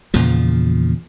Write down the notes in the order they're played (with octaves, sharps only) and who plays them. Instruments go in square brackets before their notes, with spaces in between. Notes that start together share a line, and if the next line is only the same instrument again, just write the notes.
[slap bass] E2 A#2 C#3 F3